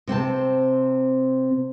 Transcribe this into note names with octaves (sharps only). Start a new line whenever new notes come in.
C3 C4 C5 A5